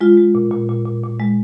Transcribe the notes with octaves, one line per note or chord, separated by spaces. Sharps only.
G#3 F4
G#3
A#2
A#2
A#2
A#2
A#2
G#3